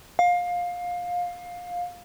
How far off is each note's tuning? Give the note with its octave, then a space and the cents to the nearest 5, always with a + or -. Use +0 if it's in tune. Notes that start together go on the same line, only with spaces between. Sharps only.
F5 +20